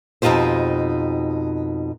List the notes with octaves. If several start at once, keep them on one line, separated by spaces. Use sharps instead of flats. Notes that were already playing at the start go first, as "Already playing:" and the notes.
F2 B2 D#4 F4 G4 C5